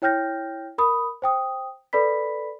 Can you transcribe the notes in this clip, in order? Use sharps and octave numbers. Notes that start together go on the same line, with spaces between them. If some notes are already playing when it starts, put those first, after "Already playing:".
E4 C#5 G5 F6 G6 A#6
A#4 B5 D#6
C5 G5 D#6
A4 B4 D5 B5 B6